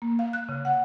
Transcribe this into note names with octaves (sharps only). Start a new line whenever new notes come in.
A#3
F5
F#6
C#3
F#5